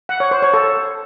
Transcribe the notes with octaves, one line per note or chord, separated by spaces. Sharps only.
F#5
C#5
C5
C#5
A4